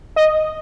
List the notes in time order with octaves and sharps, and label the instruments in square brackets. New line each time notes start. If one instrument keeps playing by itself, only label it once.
[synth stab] D#5